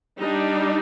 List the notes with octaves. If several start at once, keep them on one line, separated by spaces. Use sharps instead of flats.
G3 D4 D#4